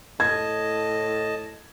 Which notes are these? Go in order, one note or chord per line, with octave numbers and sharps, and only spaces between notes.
A2 D#5 A5 G#6